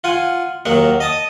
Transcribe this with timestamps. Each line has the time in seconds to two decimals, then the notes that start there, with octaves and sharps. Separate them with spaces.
0.04 F4 F#5 G#5
0.66 D#2 F#3 A#3 F#5
1.00 D#5 A5 D#6